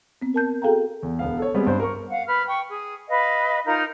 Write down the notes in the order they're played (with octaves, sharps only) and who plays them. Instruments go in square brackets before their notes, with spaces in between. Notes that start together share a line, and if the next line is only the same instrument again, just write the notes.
[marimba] B3 C4
A#4 A5 G6
F#4 G#4 A4 F5 G5 A#5
[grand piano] E2
E1 B3 F5
A4 C#5
G3 G#3 B3 C4
G2 C5
A#4 C#6
[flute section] F5 F#5
B4 F6
G5 C#6
G#4
B4 D#5 F5
D#4 F4 A#4 G6